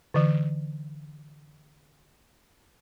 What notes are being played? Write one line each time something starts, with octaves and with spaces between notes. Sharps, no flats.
D3 E3